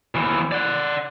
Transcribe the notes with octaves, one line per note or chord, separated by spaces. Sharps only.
D#2 E3
D5 F#5